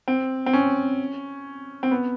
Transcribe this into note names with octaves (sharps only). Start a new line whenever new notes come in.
C4
C4
C#4
C4
B3